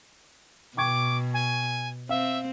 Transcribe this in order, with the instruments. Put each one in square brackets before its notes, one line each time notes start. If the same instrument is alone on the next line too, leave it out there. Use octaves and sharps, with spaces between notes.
[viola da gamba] B2 [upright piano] G5 C#6 G#6 [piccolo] D6
[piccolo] G#5
[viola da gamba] C4 [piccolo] E5 [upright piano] F5